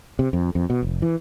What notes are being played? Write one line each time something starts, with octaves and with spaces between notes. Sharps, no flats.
C3
F2
F2
B2
F1
E3